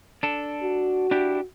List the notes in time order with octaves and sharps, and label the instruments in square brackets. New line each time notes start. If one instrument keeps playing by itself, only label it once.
[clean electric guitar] D4 A4
[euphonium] F#4
[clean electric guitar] D4 E4 G4